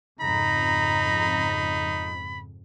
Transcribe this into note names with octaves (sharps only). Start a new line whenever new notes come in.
F2 G#2 C#3 D#4 A#5 B5